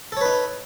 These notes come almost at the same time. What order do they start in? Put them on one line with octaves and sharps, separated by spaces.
A4 C#5 B4 D#4